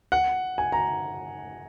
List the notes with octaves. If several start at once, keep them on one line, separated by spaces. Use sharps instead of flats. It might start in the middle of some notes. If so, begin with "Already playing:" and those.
F#5
G#5
A#5